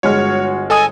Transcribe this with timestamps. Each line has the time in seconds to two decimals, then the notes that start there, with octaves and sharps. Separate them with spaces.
0.03 G1 G#3 F#4 C#5 F6
0.70 A4 D#5 G#5 D#6